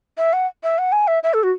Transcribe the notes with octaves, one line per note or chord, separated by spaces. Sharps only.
E5
F#5
E5
F#5
G#5
E5
E5
A4
F#4